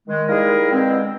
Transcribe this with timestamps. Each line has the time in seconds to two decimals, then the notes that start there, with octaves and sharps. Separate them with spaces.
0.08 D#3 G#3
0.28 G3 A#3 D#4 E4 G#4 A#4
0.71 B2 D3 G#3 C4